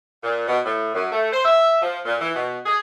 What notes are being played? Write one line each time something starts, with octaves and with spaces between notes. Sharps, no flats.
A#2
B2
A2
F#2
A3
C5
E5
F3
A#2
E3
B2
G#4